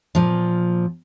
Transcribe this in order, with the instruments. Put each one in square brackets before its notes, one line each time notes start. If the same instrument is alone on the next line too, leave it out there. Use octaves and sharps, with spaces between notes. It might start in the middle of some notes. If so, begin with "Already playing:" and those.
[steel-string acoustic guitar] A#2 F3